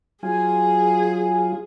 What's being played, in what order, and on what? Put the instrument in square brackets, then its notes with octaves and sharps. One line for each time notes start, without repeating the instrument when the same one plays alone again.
[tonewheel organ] F#3 F4 [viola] G#4 [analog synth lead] G#5